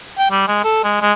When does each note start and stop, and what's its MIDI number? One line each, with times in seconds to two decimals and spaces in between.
0.18 0.27 79
0.31 0.43 55
0.48 0.60 56
0.64 0.80 69
0.84 1.00 56
1.02 1.13 56